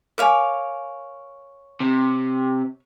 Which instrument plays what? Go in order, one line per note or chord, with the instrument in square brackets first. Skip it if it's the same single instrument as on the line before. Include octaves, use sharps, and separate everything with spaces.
[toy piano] A#4 G#5 [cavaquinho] C#5 F5 D6
[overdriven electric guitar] C3